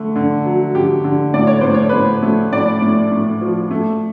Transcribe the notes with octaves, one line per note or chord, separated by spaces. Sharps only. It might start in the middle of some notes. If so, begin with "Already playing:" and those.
Already playing: D3 A3
D3
F#3
D3 G4
D3
A2 D5
C#5
A2 C5
C#5
B4
A2 C5
A3
A2 D5
A2
A2
F3
A3